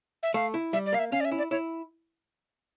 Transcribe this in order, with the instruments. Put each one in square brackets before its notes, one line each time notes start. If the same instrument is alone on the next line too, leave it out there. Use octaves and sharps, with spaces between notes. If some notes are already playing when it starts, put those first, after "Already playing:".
[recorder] E5
[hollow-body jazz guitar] A3 [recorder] F5
[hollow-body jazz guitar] E4
[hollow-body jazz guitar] G3 [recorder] E5
[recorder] D5
[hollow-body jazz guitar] A#3 [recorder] F5
[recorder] E5
[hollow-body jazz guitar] C#4 [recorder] F5
[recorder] D5
E5
[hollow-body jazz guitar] E4
[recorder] D5
[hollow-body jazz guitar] E4 [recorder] C#5